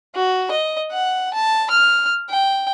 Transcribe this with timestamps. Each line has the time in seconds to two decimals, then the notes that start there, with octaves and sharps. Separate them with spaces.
0.15 F#4
0.51 D#5
0.92 F#5
1.34 A5
1.70 F6
2.29 G5